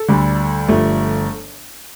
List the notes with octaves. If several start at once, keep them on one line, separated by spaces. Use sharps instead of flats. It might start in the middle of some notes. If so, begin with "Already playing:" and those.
Already playing: A4
D2 D3 G3
G1 G2 F3 A3